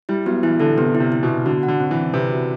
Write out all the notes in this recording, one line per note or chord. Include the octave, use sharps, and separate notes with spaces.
G3 E4
F#3 B3
E3 E4
D3 A4
C3 B3
E4
C3
E4
B2
B3
D3 F#4
F#5
D3
C4
E3
C4
C3 B4
F#4